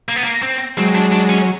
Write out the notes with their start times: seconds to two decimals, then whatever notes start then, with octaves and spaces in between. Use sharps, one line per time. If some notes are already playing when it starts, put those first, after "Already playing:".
0.09 A#3
0.16 B3
0.24 A#3
0.42 C4
0.77 F#3 G#3 C4
0.95 D4
1.12 D4
1.29 C#4